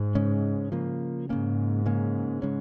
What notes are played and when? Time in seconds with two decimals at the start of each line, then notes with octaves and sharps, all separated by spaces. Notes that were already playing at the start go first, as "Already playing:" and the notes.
Already playing: G#2
0.15 C#3 G#3 C#4
0.72 C#3 F3 A#3
1.28 G#2 C#3 A#3 C#4
1.86 C#3 A#3 C#4
2.42 C#3 G#3 C#4